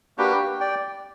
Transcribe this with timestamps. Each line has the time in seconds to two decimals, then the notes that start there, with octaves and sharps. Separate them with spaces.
0.18 A#3 D4 F#4 G4 B4
0.60 D5 G5